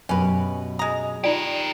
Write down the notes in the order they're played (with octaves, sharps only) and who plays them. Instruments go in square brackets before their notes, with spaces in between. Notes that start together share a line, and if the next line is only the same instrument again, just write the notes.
[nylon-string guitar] F#2 B2 G4 [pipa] C#4 B4
[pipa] G#3 A#5 [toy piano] D#6
[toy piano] D#4 F4 D5 [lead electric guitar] G4 A#4